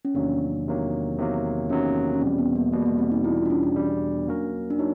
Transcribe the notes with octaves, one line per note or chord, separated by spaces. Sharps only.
C#4
E2 C3 D#3 F#3 A#3 D4
E2 C3 D#3 F#3 A#3
E2 C3 D#3 F#3 A#3
E2 C3 D#3 F#3 A#3 C#4
C#4
E2 B2 G3 C4
B3
A#3
E2 B2 G3 A#3
A#3
C4
D#4
E2 B2 G3 E4
F4
D4
C#4
D4
E2 B2 G3
F#3 A#3 C#4 F#4 A#4
D4
F#3 D#4